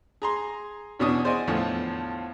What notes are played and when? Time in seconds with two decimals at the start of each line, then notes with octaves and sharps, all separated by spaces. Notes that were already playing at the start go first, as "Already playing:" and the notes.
0.22 G#4 A#5 C6
0.99 E2 B2 C#4 D4 C#5 D#6
1.24 G#4 C5 D5 D#5 F#5 G#5
1.48 E2 A2 D3 F3